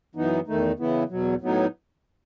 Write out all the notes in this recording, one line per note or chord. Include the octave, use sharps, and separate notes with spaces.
F#2 E3 B3 D#4
E2 D#3 A3 D#4
C#3 E3 B3 E4
E2 B2 F#3
A2 F#3 B3 D#4